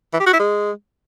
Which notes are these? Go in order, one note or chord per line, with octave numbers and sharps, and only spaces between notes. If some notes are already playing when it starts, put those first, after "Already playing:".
E3
G4
F#4
E4
G#3